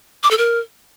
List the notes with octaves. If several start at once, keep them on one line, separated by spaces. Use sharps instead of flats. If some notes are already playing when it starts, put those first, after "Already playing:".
D6
A4
A#4